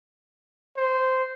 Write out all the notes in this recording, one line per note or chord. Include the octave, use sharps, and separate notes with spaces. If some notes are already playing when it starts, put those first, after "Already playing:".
C5